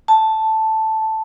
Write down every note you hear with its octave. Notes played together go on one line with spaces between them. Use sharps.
A5